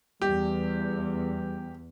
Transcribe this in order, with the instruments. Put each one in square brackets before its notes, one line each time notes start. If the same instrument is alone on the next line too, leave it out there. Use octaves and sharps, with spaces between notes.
[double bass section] E2 [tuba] G3 [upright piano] G4